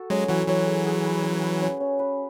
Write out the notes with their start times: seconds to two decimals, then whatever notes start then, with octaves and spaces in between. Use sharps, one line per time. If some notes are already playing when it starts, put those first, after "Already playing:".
Already playing: F#4 A4
0.10 F#3 G#3 C#4
0.29 E3 F#3 F#4
0.48 E3 F#3 C#4
0.67 G#4
0.86 G#4
1.05 B4
1.23 C#4
1.43 B4
1.62 C#4
1.80 C#4
1.99 B4